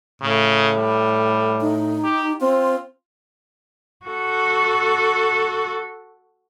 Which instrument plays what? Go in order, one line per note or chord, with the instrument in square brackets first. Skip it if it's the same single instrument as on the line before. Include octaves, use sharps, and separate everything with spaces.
[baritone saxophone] A2 [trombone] C#3
[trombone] G3
[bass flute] D#4
[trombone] G4
[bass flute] C4 [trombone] F4
[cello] F#4 A4